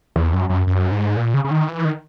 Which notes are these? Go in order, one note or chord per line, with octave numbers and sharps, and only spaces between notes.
E2
F#2
F#2
F#2
G#2
A#2
C#3
C#3
D#3
E3
D#3